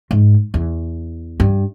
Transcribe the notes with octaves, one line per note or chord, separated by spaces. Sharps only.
G#2
E2
G2